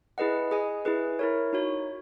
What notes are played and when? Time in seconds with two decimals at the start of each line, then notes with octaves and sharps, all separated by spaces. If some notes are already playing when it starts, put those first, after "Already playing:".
0.18 E4 G#4 B4 D#5 F#5
0.51 G#4 D#5 G#5
0.85 E4 G#4 B4
1.19 E4 A#4 C#5
1.53 D#4 F#4 C#5